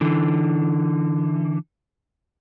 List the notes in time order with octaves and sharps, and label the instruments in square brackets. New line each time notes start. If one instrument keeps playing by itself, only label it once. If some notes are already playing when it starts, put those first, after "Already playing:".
[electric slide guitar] D3 E3